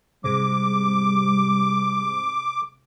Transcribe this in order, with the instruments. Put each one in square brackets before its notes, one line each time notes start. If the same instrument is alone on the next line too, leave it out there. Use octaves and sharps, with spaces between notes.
[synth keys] G#2 C3 [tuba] G3 [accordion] D6